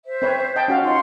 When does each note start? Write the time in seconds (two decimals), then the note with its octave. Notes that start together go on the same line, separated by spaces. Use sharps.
0.05 C5 E5
0.22 C4 B4 C#5
0.56 D#5 G5 A5
0.68 C#4 F#4 F5
0.84 D#4 F4 F5 F#5 C6